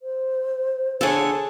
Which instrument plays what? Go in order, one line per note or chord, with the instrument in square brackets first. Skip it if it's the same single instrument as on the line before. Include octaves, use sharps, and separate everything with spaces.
[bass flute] C5
[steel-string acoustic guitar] D3 C#5 [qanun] G#4 A4